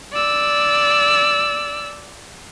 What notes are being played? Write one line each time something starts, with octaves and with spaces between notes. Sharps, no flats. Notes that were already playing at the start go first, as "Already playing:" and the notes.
D5 E6